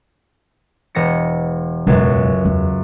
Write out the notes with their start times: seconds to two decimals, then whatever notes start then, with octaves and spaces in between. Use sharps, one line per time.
0.95 E1 A#6 C#7
1.87 E1 C#2 F#2
2.45 E2